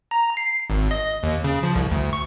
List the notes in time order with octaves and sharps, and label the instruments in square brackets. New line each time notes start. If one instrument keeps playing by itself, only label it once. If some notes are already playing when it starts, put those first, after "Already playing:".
[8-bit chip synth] A#5
C7
G#1
D#5
D#2
C#3
F3
C2
D2
C#6